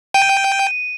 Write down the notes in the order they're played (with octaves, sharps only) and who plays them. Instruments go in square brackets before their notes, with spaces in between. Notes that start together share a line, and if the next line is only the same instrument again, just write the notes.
[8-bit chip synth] G5 [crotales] D#7